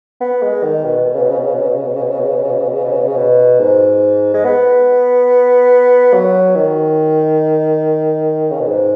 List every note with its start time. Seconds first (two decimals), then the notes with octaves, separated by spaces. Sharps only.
0.21 B3
0.42 G#3
0.63 D#3
0.84 B2
1.05 B2
1.14 C#3
1.21 B2
1.30 C#3
1.38 B2
1.46 C#3
1.54 B2
1.62 C#3
1.70 B2
1.78 C#3
1.87 B2
1.95 C#3
2.02 B2
2.11 C#3
2.19 B2
2.26 C#3
2.35 B2
2.43 C#3
2.51 B2
2.59 C#3
2.67 B2
2.75 C#3
2.84 B2
2.92 C#3
3.00 B2
3.08 C#3
3.16 B2
3.60 G#2
4.34 G#3
4.44 B3
6.13 F#3
6.56 D#3
8.51 C#3
8.60 B2
8.68 G#2